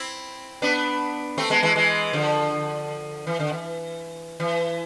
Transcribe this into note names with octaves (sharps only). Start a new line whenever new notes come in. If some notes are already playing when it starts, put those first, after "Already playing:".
Already playing: C4 E4
B3 D4
A3 C4
G#3 B3
E3 G#3
E3 G#3
D3 F3
E3
D3
E3
E3